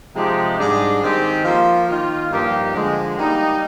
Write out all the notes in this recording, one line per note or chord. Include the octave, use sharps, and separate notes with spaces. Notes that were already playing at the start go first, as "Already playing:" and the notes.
C3 F3 G#3 D#4 G4
G#2 G3 D4 G#4
D#3 G#3 C4 G4
F3 A#3 F4
D#3 A#3 F4
G2 F3 A#3 D#4 G4
D3 F3 G#3
G3 A#3 D#4